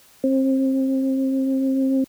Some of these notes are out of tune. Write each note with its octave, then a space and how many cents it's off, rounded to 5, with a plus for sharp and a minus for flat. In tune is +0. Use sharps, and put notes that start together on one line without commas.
C4 +30